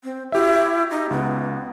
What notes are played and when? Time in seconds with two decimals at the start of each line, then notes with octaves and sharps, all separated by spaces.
0.04 C4
0.32 E4 F#4 G4 E5
0.91 D#4
1.10 C#2 B3